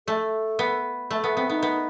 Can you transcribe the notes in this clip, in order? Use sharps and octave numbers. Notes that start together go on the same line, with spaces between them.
A3 A4
B3
A3 A4
B3 A4
B3 C4
B3 D#4
B3